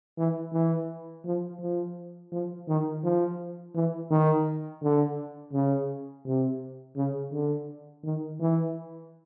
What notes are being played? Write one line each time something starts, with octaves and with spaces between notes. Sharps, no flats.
E3
E3
F3
F3
F3
D#3
F3
E3
D#3
D3
C#3
C3
C#3
D3
D#3
E3